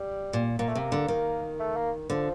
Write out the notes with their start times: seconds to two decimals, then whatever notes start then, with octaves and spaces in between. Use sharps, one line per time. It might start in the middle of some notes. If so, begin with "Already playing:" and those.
Already playing: G3
0.33 A#2
0.59 A#2 A#3
0.69 A3
0.75 C3 A#3
0.92 D3
1.08 D#3
1.60 A3
1.76 A#3
2.10 D3 F3